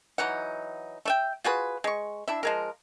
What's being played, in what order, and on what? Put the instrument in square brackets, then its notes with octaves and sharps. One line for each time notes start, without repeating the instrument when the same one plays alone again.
[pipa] E3 F#3 D#4 F#5
A3 E5 G5
F4 F#4 G#4 B4
G#3 C#6
D4 E4 E5
F3 G#3 A#4